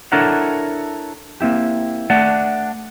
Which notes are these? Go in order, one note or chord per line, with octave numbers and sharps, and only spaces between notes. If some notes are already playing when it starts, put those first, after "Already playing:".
D4 E4 A4 A#4 C#5 F#5
A#3 C4 E4 G4
A3 D4 D5 F#5